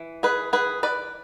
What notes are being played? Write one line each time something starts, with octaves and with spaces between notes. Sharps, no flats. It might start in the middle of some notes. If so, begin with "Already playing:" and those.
Already playing: E3
G#4 B4
G#4 B4
B4 D5